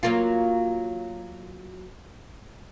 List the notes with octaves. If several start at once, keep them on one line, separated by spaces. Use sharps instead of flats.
F#3 A#3 F4